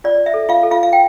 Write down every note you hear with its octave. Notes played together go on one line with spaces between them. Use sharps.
F4 D5
E5
A4
F4 F5
A4
F4 F5
F5
G5